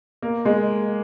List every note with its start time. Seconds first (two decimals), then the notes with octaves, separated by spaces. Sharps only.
0.22 A#3
0.45 G#3